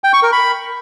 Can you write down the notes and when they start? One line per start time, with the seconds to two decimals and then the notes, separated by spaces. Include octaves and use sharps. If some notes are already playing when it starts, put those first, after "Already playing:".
0.04 G5
0.13 C#6
0.23 A#4
0.32 B5